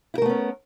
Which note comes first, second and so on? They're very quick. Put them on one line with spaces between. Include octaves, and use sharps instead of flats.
E4 A#4 A3 B3 C#4